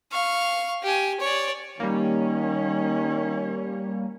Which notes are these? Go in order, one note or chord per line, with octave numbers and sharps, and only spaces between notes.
F5 C#6
G4 G#5
C#5 D5
D#3 G3 A#3 C#4 C#5